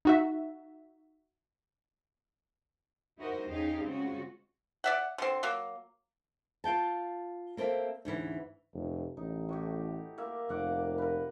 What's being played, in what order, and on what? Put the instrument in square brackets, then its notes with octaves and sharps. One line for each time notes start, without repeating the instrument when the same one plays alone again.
[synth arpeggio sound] D#4 F#4 E5
[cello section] D#4 E4 F#4 A#4 C5 D#5
E2 C#4 D#4 G4 G#4 F5
C#3 G#3 C4 C#4 F4 F#4
[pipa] D5 E5 F#5
D3 C4
F#3 A#3
[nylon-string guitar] F4 F5 G5 A5
A#3 C4 A4 D5 E5 F5
D2 G#2 E3 C#4
[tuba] F1
[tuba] A1 [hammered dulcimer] D#4
[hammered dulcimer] A2 F#4 G4
A#3 A#4 E5
[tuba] F1 [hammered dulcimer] F5 F#5 D6
[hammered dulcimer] A#4 B4